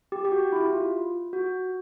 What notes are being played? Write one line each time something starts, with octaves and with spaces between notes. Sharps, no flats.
G4
G4
F#4
E4
F4
F#4